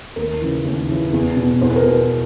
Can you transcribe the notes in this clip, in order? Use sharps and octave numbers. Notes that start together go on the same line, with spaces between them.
D#2 A#4
C#3 E3
D#2
C#3 E3
E2
B2
E2 C5
B4
A#4
B2 B4